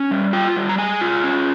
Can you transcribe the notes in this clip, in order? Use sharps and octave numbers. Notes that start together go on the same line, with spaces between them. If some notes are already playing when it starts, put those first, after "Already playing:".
Already playing: C#4
G3
F4 G5
G3
A#5
G#3 G#5
F4
C#4